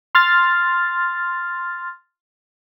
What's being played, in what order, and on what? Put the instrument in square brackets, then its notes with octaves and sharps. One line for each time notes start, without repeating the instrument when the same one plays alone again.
[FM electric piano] C6 F6 A6